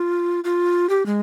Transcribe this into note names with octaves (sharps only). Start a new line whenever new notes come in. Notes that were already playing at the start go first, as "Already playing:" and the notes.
Already playing: F4
F4
G4
G#3